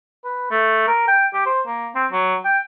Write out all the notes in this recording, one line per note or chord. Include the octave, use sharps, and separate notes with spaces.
B4
A3
A#4
G5
G4
C5
A#3
C4
F#3
G5